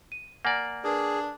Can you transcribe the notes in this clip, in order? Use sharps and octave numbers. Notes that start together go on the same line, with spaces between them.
D#7
A#3 D5 F#5 G#5 A#5
D4 G#4 A#4 B4